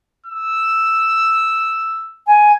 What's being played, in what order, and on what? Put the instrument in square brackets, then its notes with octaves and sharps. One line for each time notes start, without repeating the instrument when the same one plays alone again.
[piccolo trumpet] E6
[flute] G#5